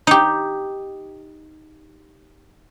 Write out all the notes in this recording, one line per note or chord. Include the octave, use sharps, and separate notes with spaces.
D#4 G4